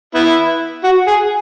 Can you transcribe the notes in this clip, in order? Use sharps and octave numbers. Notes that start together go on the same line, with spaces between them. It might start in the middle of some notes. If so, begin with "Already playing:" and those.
B3 E4
F#4
G#4